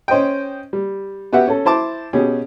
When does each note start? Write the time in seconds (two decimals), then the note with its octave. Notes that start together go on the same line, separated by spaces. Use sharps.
0.08 C#4 C5 D#5 G5
0.73 G3
1.33 B3 F#4 G4 E5 F#5
1.48 C#4 A4
1.65 E4 C5 A5 D6
2.13 B2 C#4 G4 G#4